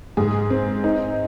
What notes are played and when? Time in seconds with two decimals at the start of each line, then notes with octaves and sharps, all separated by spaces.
0.17 G#2 G#4
0.50 C4
0.84 D#4